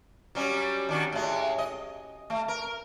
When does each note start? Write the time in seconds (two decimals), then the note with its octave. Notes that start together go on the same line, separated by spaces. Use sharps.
0.35 F#3 G3 C#4
0.89 D#3 D4 F#4
1.12 A2 G#3
1.58 D#5
2.30 A3
2.48 A#4